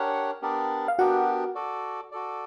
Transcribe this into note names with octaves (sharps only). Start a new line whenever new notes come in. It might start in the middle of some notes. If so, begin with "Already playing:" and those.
Already playing: D4 G4 A#4 C#5 F#5
B3 D4 G4 A#4 D5
F5
B3 D4 F#4 G4 A#4 D5 F#5
F#4 A4 D5
F#4 A4 D5